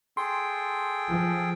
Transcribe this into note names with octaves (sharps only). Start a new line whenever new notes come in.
G#4 A4 G5 C6
F3